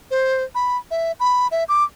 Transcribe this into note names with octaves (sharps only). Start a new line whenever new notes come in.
C5
B5
E5
B5
E5
D6